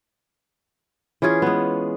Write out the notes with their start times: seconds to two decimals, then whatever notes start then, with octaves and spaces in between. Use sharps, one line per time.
1.22 E3 C#4 F4 G#4
1.42 G#3 B3